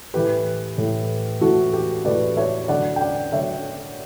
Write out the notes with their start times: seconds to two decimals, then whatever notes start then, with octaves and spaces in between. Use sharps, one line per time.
0.14 A2 E3 A3 G4 B4
0.77 A2 E3 A3
1.41 A2 E3 A3 F#4 A4
1.73 G4
2.05 A2 E3 A3 B4 D5
2.37 C#5 E5
2.68 D3 F#3 A3 D5 F#5
2.96 G5
3.01 D5 F#5
3.32 D3 F#3 A3 C#5 E5